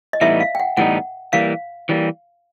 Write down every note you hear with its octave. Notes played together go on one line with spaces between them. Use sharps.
D#5
A2 E3 G3 B3 D#4 E5
F5
G5
F#5
A2 E3 G3 B3 D#4 F#5
E3 G3 A#3 F5
E3 G3 A#3